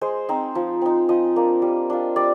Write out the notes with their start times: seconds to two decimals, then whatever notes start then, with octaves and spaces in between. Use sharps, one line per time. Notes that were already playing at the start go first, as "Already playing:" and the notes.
0.01 G#3 C5
0.29 C4 D#4
0.55 F3
0.81 C4 D#4
1.09 F3 D#5
1.36 A#3 D4
1.62 G3
1.90 D4 F4
2.16 G3 D5